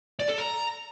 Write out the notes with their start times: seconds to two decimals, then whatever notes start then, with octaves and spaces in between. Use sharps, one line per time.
0.19 D5
0.29 A4
0.38 A#5